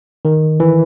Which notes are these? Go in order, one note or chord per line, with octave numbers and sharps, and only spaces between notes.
D#3
E3